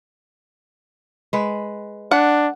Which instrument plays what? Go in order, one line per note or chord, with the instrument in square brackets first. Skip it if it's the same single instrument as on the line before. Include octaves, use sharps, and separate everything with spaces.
[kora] G#3 B4
[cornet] D4 [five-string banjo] F#5